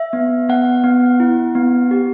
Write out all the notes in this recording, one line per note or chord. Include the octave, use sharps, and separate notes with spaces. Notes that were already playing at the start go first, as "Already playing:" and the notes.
Already playing: E5
B3
B3 F#5
B3
E4
B3
G4